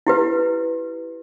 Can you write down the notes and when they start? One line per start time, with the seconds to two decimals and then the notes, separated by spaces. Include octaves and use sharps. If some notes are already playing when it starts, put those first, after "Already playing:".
0.07 E4 G4 B4